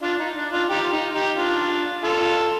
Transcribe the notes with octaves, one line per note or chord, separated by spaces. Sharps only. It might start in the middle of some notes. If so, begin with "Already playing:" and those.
D4 F4
D#4
D4
D4 F4
D#4 G4
F4
D#4
D#4 G4
D4 F4
F4 A4